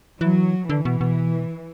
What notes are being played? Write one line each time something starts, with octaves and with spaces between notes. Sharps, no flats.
E3 F#3
D3 E3
B2
B2